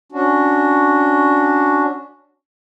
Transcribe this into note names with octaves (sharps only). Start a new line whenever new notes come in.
C#4 D4 F#4